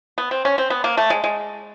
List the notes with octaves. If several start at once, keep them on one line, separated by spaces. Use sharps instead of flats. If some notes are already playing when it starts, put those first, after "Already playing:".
B3
C4
C#4
C4
B3
A#3
A3
G#3
G#3